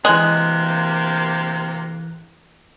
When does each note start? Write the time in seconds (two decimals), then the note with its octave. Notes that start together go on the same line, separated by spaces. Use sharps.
0.05 D2 C3 E3 G#3 A#3 F#6